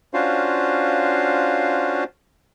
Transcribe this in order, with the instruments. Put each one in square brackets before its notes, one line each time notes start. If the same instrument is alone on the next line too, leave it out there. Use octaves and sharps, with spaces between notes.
[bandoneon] C#4 D4 F4 F#4 C5 F5